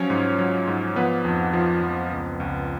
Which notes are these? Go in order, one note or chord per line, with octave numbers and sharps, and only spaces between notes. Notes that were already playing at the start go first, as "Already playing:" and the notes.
Already playing: F3 F#3 C#4 C#5
G#2
F#3
G#2
F3 B3 B4
F2
F3
F2
C#2
C#2